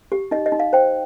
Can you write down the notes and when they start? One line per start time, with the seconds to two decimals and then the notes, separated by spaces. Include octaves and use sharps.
0.12 G4
0.31 D#4 D#5
0.46 D#5
0.52 D#4
0.60 F5
0.73 C5 G5